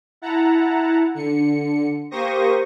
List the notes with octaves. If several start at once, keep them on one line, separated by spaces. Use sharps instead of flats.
E4 F#5 A5 A#5
D3 C#7
A#3 G4 C5 C#6 D#6 A#6